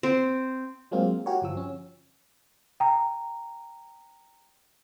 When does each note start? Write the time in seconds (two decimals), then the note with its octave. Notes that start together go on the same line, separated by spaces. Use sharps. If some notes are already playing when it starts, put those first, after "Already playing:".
0.03 C4
0.91 F#3 G#3 A#3 C4 F4
1.26 F#4 G4 A#4 C#5
1.42 G1 F3 E6
1.57 C#4
2.80 G5 A#5